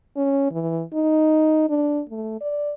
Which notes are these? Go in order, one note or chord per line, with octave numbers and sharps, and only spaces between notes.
C#4
E3
D#4
D4
A3
D5